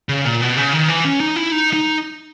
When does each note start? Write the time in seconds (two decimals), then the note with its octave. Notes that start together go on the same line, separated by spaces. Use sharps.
0.09 C#3
0.25 A#2
0.41 B2
0.57 C#3
0.73 D#3
0.88 E3
1.05 C#4
1.20 D#4
1.36 E4
1.52 D#4
1.73 D#4